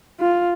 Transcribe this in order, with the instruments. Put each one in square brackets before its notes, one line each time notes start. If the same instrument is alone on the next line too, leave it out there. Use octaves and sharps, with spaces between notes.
[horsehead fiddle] F4